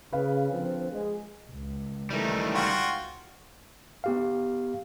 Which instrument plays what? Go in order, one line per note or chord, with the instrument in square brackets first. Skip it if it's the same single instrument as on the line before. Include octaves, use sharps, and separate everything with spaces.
[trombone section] C#3 [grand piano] B4 F5
[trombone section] D3 F3 C4
G#3
[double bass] C#2
[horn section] D#3 E3 A3 [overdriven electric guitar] G3 D#4
[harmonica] F4 F#4 G5
[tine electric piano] B3 G4 F5